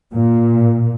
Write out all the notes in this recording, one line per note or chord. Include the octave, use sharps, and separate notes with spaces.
A#2